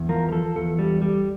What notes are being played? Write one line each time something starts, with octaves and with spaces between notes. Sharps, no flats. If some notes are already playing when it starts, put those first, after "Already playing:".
Already playing: E2
F3 A#4
A#4
F3 A4
E2 A4
G3
G3